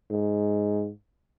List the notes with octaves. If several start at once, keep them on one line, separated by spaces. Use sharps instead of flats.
G#2